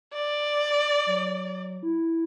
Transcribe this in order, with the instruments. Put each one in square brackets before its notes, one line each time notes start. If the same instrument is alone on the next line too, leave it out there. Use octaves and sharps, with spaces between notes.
[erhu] D5
[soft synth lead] F#3
E4